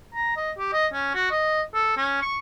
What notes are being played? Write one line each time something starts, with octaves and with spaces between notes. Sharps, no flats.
A#5
D#5
G4
D#5
C#4
F#4
D#5
A4
C#4
C#6